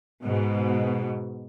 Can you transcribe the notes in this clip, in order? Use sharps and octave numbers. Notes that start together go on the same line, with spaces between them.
G#2 B2